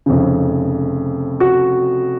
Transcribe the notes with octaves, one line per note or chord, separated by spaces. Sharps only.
F1 F2 C#3
F#4